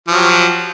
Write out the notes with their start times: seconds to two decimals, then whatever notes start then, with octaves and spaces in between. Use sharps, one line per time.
0.08 F3
0.10 F#3
0.13 G4